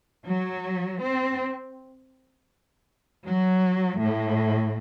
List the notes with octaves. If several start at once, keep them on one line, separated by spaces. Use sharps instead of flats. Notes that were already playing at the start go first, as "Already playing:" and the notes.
F#3
C4
F#3
A2